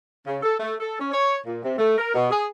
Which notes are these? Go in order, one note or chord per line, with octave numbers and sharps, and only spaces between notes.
C#3
A4
A3
A4
C#4
C#5
A#2
C3
A3
A#4
B2
G#4